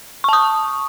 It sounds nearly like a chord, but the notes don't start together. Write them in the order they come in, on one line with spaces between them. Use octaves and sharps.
C#6 A5 D#6